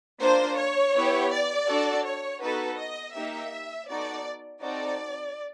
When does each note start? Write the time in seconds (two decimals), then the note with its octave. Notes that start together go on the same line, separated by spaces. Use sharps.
0.21 A#3 D4 F4 C5
0.58 C#5
0.95 B3 E4 G4
1.32 D5
1.68 D4 F#4 A4
2.05 C#5
2.42 B3 D#4 F#4 A4 B4
2.78 D#5
3.15 A#3 D#4 G4 E5
3.89 B3 D#4 F#4 A4 D5
4.62 C4 D#4 F#4 A4 D5